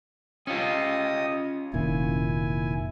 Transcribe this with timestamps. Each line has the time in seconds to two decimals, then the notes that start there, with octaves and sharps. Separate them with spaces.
0.47 C#4 F4 G4 D#5 D#6
1.73 F1 A#2 D#3 E4 G#5